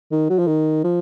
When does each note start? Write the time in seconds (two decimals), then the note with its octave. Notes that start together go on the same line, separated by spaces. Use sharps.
0.11 D#3
0.30 F#3
0.39 F3
0.47 D#3
0.84 F3